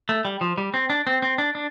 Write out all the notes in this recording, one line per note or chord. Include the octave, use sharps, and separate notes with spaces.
A3
G3
F3
G3
C4
D4
C4
C4
D4
D4